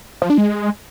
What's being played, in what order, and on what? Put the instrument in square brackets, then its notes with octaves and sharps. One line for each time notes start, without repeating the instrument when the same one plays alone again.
[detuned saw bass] F3
D4
G#3